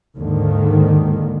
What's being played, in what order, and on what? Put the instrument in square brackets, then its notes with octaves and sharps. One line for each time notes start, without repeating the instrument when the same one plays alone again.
[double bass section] D#2 G#2 D3 D#3